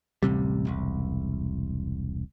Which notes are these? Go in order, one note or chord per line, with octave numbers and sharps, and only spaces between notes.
D1 A1 C3 G3
E1 C2